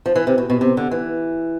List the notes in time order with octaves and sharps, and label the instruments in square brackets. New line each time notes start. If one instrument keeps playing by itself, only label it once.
[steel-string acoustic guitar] F3
E3
C3
B2
B2
C3
D3
E3